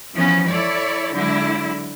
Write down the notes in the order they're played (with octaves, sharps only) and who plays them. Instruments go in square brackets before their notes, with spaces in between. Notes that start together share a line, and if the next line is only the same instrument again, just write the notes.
[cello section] E3 F3 B3 C#4
E4 A4 C#5 D5
D3 F#3 G#3 E4